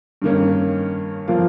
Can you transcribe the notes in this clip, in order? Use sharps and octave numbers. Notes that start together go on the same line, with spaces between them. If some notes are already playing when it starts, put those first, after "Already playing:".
G2 D#3 A#3 C#4
F3 A#3 F4